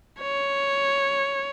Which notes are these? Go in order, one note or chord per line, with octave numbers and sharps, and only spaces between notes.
C#5